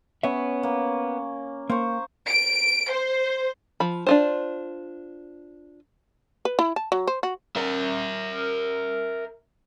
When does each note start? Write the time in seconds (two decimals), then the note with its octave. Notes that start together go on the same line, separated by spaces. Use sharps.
0.23 B3 C#4 E5
0.63 A#3
1.70 A#3 C5 C#6
2.29 D7
2.91 C5
3.80 F3 B5
4.07 D4 F4 C5
6.45 B4
6.59 E4
6.76 A5
6.92 F#3
7.07 C5
7.23 F#4
7.56 A#4 E5